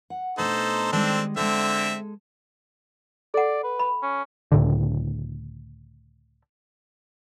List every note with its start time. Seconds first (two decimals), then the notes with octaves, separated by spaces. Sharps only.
0.10 F#5
0.38 B2 A3 D4 D#4 A4 C5
0.92 D#3 G3 G#3 C4 D4 A4
1.37 D3 G#3 C4 A4 E5
3.34 A4 D5 F#5
3.64 B4
3.79 B5
4.02 C#4
4.52 C#2 A2 D3